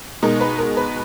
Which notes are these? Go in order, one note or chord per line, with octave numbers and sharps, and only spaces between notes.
B2 G#3 D#4 A#4
B4
A#4
B4